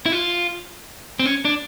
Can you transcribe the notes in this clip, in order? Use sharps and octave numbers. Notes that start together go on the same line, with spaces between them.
E4
F4
C4
C#4
D4